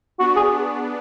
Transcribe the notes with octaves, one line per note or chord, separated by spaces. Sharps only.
B3 D4 F#4
G#4